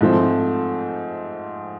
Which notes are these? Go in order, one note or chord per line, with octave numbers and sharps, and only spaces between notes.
G#2 F3 A3 C4